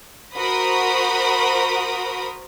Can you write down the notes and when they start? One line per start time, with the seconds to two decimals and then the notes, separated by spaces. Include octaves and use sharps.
0.36 F#4 A#4 C5 B5 D#6